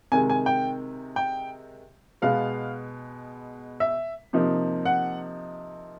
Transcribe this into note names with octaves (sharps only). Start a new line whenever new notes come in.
C3 D#3 G#3 G#5
G#5
G5
G5
B2 G#3 B3 F5
E5
C3 F3 A#3 D#4
F#5